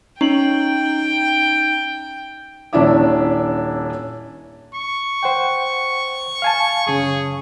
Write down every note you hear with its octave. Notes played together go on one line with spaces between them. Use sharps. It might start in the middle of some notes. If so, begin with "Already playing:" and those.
C#4 D#4 G5 F#7
D#1 C#4 D4 E4 E5 D6
C#6
C5 F#5 G5
F5 G#5 A5
F#2 C#3 G#4